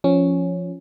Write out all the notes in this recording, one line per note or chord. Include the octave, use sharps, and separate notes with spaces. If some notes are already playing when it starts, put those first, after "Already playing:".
F3 C#4